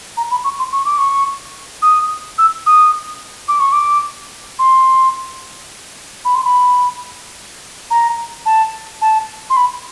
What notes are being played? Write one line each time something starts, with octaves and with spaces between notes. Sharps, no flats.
A#5
B5
C#6
C6
C#6
D6
C#6
D#6
E6
D#6
D6
C#6
D6
C6
B5
C6
B5
A#5
A5
A5
C6
B5